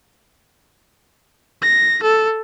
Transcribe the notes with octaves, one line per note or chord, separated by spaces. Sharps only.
A#6
A4